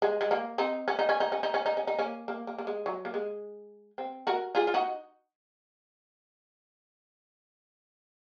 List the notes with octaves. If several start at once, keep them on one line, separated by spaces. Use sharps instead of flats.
G#3
G#3
A#3
C4 D#4
C#4
D#4
C#4
D#4
C#4
D#4
C#4
D#4
C#4
D#4
A#3 C#4
A#3
A#3
A#3
G#3
F#3
A#3
G#3
C4
F#4 A#4
F4 G#4
F4
D#4 F#4